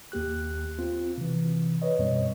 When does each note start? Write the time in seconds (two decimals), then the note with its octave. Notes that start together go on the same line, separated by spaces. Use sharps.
0.12 D#2 A#3 G4 F#6
0.79 C4 F4
1.18 C3 E3
1.82 B4 C#5 D#5
1.99 F#2 B2 G3 C4 C#5 D#5